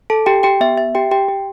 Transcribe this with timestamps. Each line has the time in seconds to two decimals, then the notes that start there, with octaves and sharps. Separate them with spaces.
0.10 A4 A5
0.26 G4 G5
0.43 G4 G5
0.61 B3 E5
0.78 E5
0.95 G4 G5
1.11 G4 G5
1.28 G4